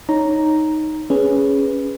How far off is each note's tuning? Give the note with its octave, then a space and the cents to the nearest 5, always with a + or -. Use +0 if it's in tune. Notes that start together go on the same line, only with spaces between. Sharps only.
D#4 +0 C#5 +0 A#5 +0
C#4 +0 G#4 +0 B4 +0